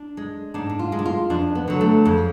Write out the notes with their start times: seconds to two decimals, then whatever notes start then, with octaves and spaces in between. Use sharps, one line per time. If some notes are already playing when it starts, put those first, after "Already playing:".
Already playing: D4
0.17 G#3
0.54 G#2 D4
0.69 D4
0.79 F4
0.92 G#3
0.99 D4
1.06 F4
1.30 F2 D4
1.55 B3
1.68 D3 F#3
1.81 A3
2.05 F2 G#3